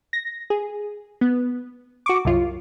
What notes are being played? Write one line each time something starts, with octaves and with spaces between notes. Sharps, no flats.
A#6
G#4
B3
F#4 C#6 D6
C2 F#2 F4